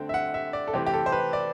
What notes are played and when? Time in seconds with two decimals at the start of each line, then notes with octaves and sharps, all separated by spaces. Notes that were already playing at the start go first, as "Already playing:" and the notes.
Already playing: D3 A3 C4 G5
0.09 E5
0.14 F#5
0.34 E5
0.53 D5
0.68 A4
0.73 C3 E3 A3 C4 G4
0.87 G4
0.94 A4
1.06 C5
1.12 B4
1.33 D5